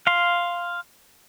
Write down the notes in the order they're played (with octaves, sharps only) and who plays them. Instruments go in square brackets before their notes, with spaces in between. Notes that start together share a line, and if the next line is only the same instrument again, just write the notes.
[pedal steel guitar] F5 C6